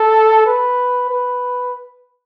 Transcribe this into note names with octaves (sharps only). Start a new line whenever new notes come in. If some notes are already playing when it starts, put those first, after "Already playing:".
Already playing: A4
B4
B4